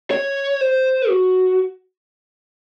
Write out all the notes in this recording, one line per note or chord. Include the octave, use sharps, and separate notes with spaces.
C#5
C5
F#4